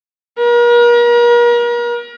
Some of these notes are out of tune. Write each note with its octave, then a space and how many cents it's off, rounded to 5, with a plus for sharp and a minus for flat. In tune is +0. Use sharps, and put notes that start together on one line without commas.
A#4 +40